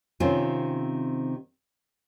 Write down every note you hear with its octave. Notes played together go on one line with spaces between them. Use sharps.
C3 D#3 C4 C#4 F4